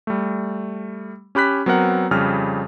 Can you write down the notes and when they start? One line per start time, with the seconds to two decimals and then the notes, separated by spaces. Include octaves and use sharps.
0.07 G3 A3
1.35 C#4 G4 B5 F#6 B6
1.66 F#3 B3 C4 A#4 F#5
2.11 F2 C#3 G3 F6